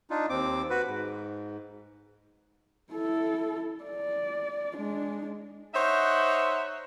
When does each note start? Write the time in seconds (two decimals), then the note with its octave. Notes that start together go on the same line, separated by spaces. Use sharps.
0.10 D4 D#4 F4
0.29 D#2 C4 D6
0.70 F#4 B4
0.88 G#2
2.92 E4 A4
3.84 D5
4.77 G#3 D4
5.75 D#4 C5 C#5 E5 F#5